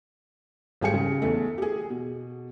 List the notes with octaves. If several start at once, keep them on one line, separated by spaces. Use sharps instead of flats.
G#1 G3 G#4 G5 C#7
C#3
E2 A3
G4 G#4
B2